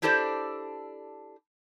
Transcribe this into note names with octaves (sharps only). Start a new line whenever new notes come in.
D4 E4 G4 A4 C5 D5